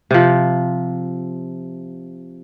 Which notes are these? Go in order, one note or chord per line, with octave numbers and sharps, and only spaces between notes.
C3 F3